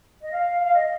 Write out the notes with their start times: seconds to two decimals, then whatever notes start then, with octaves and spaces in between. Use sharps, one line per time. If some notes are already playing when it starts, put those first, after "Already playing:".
0.21 D#5
0.32 F5
0.62 F5
0.74 D#5